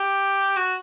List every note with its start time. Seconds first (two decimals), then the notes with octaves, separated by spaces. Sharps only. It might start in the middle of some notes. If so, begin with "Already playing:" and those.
Already playing: G4
0.57 F#4